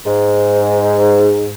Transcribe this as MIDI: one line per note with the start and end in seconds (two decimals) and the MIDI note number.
0.06 1.54 44